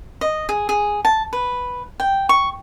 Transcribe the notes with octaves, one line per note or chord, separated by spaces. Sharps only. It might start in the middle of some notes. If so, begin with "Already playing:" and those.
D#5
G#4
G#4
A5
B4
G5
C#6